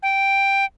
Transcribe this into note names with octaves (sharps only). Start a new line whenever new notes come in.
G5